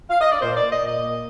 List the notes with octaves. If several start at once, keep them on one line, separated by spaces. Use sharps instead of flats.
F5
D#5
D5
A#2 C5
A#2 D5
D#5
A#2
D#5
A#3